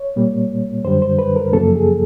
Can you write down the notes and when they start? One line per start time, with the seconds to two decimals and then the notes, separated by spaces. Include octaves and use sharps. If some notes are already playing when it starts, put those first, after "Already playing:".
Already playing: C#5
0.16 A#2 G3 A#3
0.85 F#2 D3 G3 C5
1.02 C5
1.19 B4
1.36 A#4
1.53 F#2 C#3 F3 A#3 A4
1.76 G#4